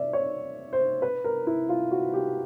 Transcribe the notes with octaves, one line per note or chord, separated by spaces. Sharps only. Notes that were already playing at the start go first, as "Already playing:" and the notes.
Already playing: D5 E5
C#5
C5
B4
A#4
E4
F4
F#4
G4